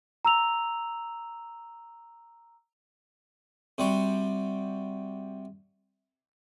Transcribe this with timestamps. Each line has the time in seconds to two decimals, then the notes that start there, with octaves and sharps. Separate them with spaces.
0.25 A#5 E6 F7
3.78 C3 G3 F#4